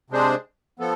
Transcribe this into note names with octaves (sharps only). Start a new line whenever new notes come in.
C3 G#3 D4 G#4 C5
F3 B3 A4